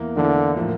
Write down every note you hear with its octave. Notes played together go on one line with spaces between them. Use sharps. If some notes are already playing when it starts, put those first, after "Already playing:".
Already playing: E2 E3 A#3
E2 D3 E3 A#3
A2 F3 A#3